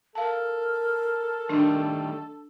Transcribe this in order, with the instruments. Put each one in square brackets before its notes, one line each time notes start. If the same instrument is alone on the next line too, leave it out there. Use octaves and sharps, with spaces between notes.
[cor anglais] A4 [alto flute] A#4 [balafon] F5 A5
[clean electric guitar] D#3 G3 A3 [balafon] D4